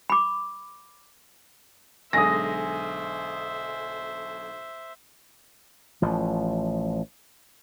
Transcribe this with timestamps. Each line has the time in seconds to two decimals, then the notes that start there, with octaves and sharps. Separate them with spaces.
0.10 B5 D6
2.13 B1 D3 G#3 C5 E5 G#5 D#6 A#6
6.02 A1 F3